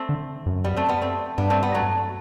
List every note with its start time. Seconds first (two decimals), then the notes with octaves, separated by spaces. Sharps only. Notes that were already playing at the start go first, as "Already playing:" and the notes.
Already playing: A3 C4
0.09 D3
0.46 F#2
0.64 G3 B3
0.76 A3 C4
0.89 G3 B3
1.01 A3 C4
1.38 G2 B3 D4
1.50 A3 C4
1.63 G3 B3
1.74 F#3 A3